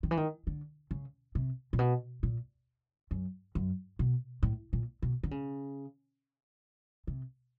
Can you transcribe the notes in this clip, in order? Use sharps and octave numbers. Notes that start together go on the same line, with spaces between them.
D#3
E3
D#3
D3
C#3
C3
A#2
B2
A#2
F#2
F#2
B2
A2
A#2
B2
D3
C#3
C3